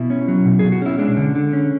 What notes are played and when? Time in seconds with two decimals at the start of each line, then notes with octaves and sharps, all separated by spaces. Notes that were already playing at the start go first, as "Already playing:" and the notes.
Already playing: B2 E4
0.10 C#4
0.28 F#3
0.45 B2
0.59 B2 G#4
0.72 F#4
0.82 C#4 E4
0.98 G#3 D4
1.17 D3
1.35 D3
1.53 C#4